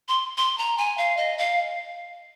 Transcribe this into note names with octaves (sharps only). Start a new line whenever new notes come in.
C6
C6
A#5
G#5
F5
D#5
F5